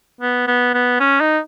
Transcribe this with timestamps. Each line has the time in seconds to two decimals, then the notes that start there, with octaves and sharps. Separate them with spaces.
0.21 B3
0.47 B3
0.74 B3
1.00 C#4
1.21 D#4